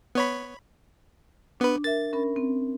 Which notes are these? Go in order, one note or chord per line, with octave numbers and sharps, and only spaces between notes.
B3 C#5 B5
B3 D4 B4
A#4 E5 A6
C#4 A#4 B5
C4